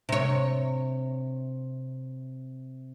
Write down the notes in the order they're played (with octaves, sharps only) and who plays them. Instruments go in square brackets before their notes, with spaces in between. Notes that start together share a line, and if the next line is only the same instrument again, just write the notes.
[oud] C3 C#5